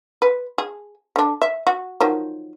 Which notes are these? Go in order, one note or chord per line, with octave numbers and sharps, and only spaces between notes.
B4
G#4
D3 D4
E5
F#4
D#3 F3 F#3